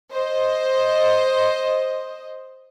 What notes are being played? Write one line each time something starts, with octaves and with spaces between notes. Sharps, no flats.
C5 D#5